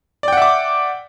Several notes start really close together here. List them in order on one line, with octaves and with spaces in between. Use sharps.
D5 G5 F#5 E5 D6